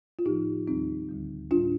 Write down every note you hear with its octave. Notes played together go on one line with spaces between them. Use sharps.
F4
A2 F3 D#4 G4
D#2 D#3 G3 C4 D#4
D2 D3 G3
A2 G3 D4 F4